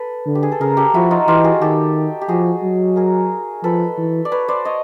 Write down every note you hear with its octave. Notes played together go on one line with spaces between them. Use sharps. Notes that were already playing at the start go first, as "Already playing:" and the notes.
Already playing: A4 B4
D3
G4
G#4
A4
C#3 G#4 A#4
G4 A4
F3 E4 F#4
D#4 F4
E3 F4 G4
F#4 G#4
D#3 G4 A4
G4
F3 F#4 G#4
F#3
G#4 A#4
F3 A4 B4
E3
D5
B4 C#5
C5 D5
C#5 D#5